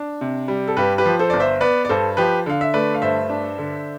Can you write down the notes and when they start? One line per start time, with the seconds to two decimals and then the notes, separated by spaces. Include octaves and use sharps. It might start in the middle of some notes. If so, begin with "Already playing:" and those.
Already playing: D4
0.21 C3
0.48 G3
0.68 A4
0.77 G2 G4 B4
0.98 G4 B4
1.06 F3
1.19 A4 C5
1.30 G1 D5
1.40 C5 E5
1.61 B3 B4 D5
1.85 D5
1.89 G2 A4 C5
2.17 F3 G4 B4
2.46 D3 F5
2.61 E5
2.74 A3 B4 D5
2.95 F5
3.02 G2 C5 E5
3.30 D4
3.58 D3